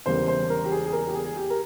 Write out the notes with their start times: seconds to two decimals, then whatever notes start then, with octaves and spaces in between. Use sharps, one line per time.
0.06 E1 E2 C#3 G3 A#3 C5
0.28 C5
0.50 A#4
0.65 G4
0.72 G#4
0.86 G#4
0.93 A#4
1.08 G4
1.15 G#4
1.25 G#4
1.36 G4
1.50 A#4